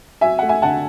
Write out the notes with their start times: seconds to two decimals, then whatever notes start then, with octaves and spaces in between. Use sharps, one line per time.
0.21 F#3 E5 G#5
0.39 A3 F#5
0.49 E5 G#5
0.62 D3 F#5 A5